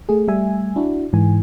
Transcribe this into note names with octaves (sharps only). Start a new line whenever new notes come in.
A3 G#4
G3 A3 E5 G#5
D4 E4 F#4
G#2 E3 G#5